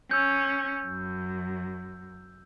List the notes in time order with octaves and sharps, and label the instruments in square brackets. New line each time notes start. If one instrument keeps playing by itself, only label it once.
[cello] C#4 [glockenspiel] E6 G6
[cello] F#2